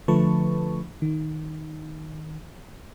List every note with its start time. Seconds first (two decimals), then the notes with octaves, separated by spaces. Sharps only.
0.08 D3 F3 A3 B4 A5 C#6
1.02 D#3